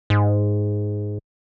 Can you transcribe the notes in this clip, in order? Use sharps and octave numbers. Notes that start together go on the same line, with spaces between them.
G#2